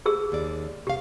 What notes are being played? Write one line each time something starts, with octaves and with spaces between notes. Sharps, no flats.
G4 G#4 E6
D#2 D5
C3 G4 F5